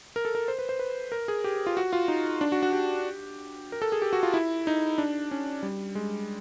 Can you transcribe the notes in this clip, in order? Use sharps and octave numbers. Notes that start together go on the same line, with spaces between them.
A#4
A4
A#4
C5
B4
C5
B4
A#4
G#4
G4
F4
F#4
F4
D#4
D4
F#4
F#4
G4
A#4
A4
G#4
G4
F#4
F4
E4
D#4
D4
C#4
G3
G#3